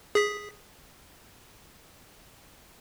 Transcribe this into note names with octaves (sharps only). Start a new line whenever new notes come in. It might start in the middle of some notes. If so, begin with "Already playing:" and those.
G#4 B6